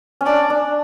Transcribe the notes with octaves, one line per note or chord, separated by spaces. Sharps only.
C#4
D4 D5
D4